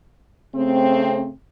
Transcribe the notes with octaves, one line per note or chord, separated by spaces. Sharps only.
C#3 A3 C4